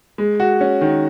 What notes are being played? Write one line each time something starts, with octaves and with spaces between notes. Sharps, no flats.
G#3
F#4
C#4
D#3